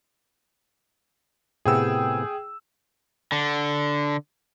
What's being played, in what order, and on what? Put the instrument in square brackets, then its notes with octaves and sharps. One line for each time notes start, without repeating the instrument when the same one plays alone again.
[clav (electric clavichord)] A2 C3 B3 [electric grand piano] G#4 G5 E6
[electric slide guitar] D3